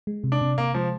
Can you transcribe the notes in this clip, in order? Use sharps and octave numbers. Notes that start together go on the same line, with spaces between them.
G#3
C3
D4
C3
C3 A#3
F3 G#3